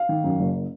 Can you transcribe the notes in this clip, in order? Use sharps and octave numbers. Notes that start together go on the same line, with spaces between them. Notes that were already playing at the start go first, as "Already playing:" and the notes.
Already playing: F5
D#3
F#2
F#1